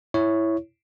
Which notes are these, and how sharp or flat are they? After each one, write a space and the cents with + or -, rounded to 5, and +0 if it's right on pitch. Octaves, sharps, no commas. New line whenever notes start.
E4 +0 C#5 +0